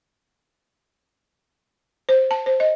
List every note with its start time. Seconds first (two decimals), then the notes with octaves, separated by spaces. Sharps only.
2.09 C5
2.31 A5
2.46 C5
2.60 D#5